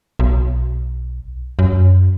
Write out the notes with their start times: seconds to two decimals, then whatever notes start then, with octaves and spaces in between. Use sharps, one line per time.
0.19 B1
1.59 F#2